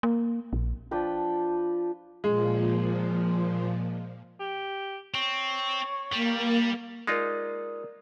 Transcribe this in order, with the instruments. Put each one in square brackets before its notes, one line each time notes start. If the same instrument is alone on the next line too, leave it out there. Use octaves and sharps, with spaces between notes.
[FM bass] A#3
A#1
[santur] F3 D4 B4 G5
[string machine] A#2 F3 [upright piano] G#3
[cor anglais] G4
[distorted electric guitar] C4 [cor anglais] C#5
[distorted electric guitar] G3 [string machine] A#3
[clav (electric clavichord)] G#3 D#4 F4 [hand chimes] A#4 D5 D#6